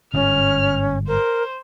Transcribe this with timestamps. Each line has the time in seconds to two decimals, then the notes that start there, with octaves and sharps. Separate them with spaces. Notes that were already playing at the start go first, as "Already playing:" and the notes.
0.13 G1 G#2 C#4 F6
1.07 A#4 C5